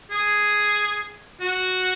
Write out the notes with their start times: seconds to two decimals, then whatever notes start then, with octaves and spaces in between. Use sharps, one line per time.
0.11 G#4
1.41 F#4